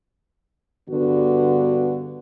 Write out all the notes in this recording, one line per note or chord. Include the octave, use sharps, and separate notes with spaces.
G2 D3 B3 F#4